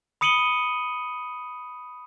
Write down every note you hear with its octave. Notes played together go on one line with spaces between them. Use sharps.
B5 D#6 C#7 D#7 F#7 G7